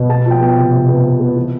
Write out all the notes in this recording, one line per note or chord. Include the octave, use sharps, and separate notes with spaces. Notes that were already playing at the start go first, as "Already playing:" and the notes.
Already playing: B2
B3 A5
F3 G5
B3
C3
C3
B3
C3
B3
E3